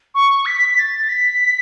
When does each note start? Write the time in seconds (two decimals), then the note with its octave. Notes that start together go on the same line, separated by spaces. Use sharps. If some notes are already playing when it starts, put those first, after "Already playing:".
0.15 C#6
0.46 B6
0.78 A6
1.09 B6